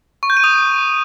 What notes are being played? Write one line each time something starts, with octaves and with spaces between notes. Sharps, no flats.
C#6
G6
D#7
D#6